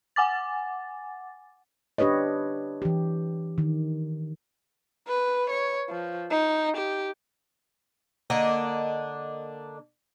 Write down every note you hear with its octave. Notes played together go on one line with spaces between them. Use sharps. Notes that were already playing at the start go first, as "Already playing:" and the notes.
F#5 G#5 D6 A6
D4 G4 B4 C#5 D#5
E3 G4
D#3
B4
C#5
F3
D#4
G4
D3 A#3 D4 D#5